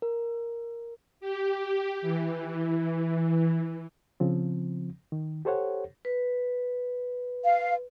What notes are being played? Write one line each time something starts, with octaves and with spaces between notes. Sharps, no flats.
A#4
G4
E3
C#3 F3 C4
D#3
G4 A4 C5 C#5 F#5
B4
F5